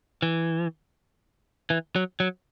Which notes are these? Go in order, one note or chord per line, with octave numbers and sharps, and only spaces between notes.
E3
E3
F#3
F#3